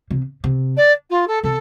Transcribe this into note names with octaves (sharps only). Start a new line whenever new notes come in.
C3
C3
D5
F4
A4
C3 A4